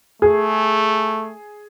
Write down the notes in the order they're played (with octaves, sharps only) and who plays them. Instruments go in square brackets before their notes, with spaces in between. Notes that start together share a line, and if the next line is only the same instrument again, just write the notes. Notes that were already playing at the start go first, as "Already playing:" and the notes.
[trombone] A3 [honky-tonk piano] G#4